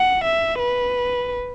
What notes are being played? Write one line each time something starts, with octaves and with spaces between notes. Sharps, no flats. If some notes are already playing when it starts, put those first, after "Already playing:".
Already playing: F#5
E5
B4